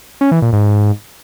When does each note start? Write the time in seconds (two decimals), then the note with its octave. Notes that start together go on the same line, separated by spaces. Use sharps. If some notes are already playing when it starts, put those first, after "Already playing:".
0.21 C#4
0.32 E3
0.42 A#2
0.53 G#2